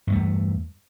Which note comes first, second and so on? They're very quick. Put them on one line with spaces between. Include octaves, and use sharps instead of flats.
G2 G#3 A3 E2